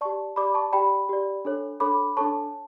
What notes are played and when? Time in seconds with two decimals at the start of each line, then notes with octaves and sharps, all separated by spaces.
0.01 G4 D5 A5 C#6
0.36 G4 D5 B5 D6
0.54 A5 C#6
0.72 G4 D5 G5 B5
1.09 G4 D5
1.45 D4 A4 C#5
1.80 D4 A4 C#5 B5 D6
2.17 D4 A4 C#5 A5 C#6